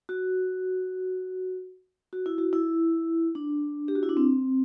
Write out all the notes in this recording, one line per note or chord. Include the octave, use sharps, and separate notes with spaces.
F#4
F#4
E4
F#4
E4
D4
G4
F#4
E4
D4
C4